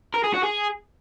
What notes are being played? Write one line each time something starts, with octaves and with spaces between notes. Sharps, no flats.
A#4
G#4
F#4
G#4